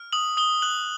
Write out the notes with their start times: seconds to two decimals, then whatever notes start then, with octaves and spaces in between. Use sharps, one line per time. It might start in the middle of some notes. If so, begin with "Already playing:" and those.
Already playing: F6
0.13 D#6 F#7
0.37 D#6 G7
0.62 F#6 F#7